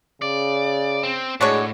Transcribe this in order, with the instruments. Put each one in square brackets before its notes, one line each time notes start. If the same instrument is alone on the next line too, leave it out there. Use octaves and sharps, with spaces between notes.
[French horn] C#3 [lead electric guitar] D5
[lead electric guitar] C4
[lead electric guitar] A2 [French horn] G#3 [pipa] D4 F#4 C#5